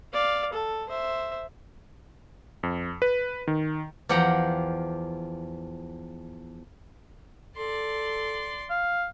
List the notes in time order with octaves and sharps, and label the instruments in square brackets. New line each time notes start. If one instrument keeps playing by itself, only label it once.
[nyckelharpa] D5 F5
A4
C5 E5
[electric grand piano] F2
B4
D#3
[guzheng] E2 F3 G4 F#5 G5 A#5
[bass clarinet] A4 [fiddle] D5 C6
[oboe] F5